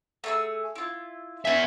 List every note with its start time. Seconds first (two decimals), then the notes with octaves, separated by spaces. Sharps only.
0.24 A3 G#4 E6
0.75 E4 F4
1.45 B3 C#4 G#4 E5